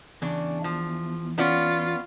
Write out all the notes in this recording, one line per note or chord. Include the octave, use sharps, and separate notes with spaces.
E2 C#3 D4
F3
B3 C#4 F4 D5